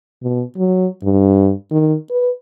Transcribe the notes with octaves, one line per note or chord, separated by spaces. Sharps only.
B2
F#3
G2
D#3
B4